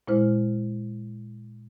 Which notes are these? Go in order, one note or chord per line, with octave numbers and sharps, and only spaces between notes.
A#2 G#3 E4 C5 F6